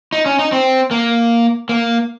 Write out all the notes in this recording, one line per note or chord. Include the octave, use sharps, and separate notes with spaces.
D#4
C#4
D#4
C4
A#3
A#3